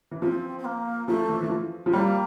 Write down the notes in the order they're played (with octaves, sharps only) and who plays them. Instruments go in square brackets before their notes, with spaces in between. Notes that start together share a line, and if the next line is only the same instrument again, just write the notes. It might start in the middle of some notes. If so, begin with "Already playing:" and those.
[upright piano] E3
[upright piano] F3 [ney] C4
[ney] C4
A#3
[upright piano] F3 [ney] A3
[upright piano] E3
E3
F3
F3
[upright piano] G3 [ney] A#3